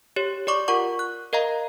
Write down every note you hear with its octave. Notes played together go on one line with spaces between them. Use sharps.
G4 C#5
G4 D5 C#6 D6
F4 A#4 F#5 C#6
F#6
A#4 D#5 F5 A#5